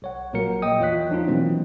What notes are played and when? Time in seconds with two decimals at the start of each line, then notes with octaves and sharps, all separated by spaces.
0.02 B1 C#5 F#5
0.33 A#1 A#2 F#3 A#3 A#4 C#7
0.62 D#5 G5 D#6
0.80 E2 F4 C#5 D#5 F#6 B6
1.10 F3 D4 D#4 F4
1.28 B2 E3 F#3 A#3 C4